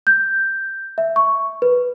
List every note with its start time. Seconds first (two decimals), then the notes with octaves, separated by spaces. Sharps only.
0.07 G6
0.98 E5
1.16 C#6
1.62 B4